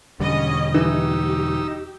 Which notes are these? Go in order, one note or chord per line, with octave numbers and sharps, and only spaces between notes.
E1 D3 G3 C#4 D#5
E3 D#4 G4 E6